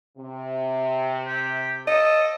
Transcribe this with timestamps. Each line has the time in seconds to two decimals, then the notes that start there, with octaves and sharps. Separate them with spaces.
0.18 C3
1.27 G4
1.88 A4 D#5